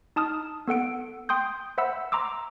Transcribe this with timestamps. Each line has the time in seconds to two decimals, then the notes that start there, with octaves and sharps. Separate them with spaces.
0.16 D#4 A5 D#6 F6
0.68 B3 A4 F#5 D7
1.29 G5 C6 D#6 G6
1.78 C5 E5 F#5 B5 E6
2.12 A#5 C6 D6 E6